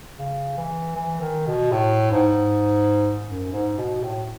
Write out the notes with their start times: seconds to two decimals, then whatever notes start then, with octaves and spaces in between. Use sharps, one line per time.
0.18 C#3
0.57 E3
0.95 E3
1.21 D#3
1.47 B2
1.72 A2
2.11 G#2
3.26 F#2
3.52 G#2
3.78 B2
4.03 A2